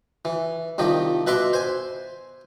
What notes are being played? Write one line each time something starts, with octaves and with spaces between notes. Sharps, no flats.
E3
C2 D#3 F3 G4
B2 B4 E5 C6 D6
C5 G#5